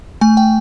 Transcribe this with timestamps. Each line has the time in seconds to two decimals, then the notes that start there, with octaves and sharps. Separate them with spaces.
0.21 A3 G#5
0.37 G5